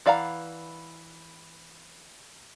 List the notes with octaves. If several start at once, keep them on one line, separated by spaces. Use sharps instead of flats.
E3 D5 F5 F#5 A#5